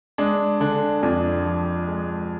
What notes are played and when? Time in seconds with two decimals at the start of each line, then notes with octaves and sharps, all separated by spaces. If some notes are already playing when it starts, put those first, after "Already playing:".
0.18 G#3 D4
0.60 D3 D4
1.03 F2 D4
1.45 F3
1.88 G#3